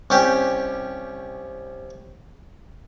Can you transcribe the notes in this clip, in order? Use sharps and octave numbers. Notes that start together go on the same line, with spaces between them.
C2 C#4 G4